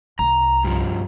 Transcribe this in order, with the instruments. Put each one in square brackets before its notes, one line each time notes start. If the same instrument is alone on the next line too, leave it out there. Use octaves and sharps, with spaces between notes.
[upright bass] C2 [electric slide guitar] A#5
[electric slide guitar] G2 F3